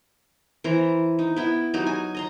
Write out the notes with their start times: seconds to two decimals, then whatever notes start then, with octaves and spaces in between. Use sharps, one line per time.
0.64 E3 C5 A#5
1.19 D#4
1.36 B3 E4 E5 G5
1.74 F#3 D#4 F#4 G4
1.87 G#5
2.15 D#5 A#5 C6